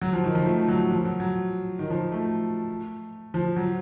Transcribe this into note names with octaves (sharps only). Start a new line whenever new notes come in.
F#3
F3
D#3
F3
A3
F#3
F3
F#3
F#3
D#3
F3
A3
F3
F#3